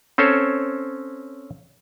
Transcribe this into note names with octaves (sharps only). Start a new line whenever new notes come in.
C4 C#4 A4 C5 C#5